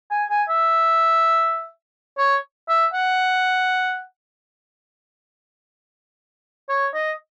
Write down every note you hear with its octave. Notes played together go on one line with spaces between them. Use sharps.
G#5
G#5
E5
C#5
E5
F#5
C#5
D#5